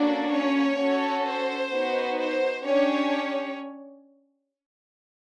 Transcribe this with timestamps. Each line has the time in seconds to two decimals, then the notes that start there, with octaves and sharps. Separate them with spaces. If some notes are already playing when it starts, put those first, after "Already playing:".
Already playing: A#3 C#4 D4 F#4 A4 D5
0.32 C#4 C#5
0.79 C#4 F#4 A4
1.26 C5
1.72 B3 D#4 F#4
2.19 C5
2.66 C#4 D4 G4 C#5